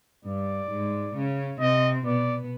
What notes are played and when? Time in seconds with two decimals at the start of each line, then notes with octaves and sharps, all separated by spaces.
0.25 G2 G3 D5
0.70 G#2 G#3
1.16 C#3 C#4
1.60 C3 C4 D#5
2.06 B2 B3 D5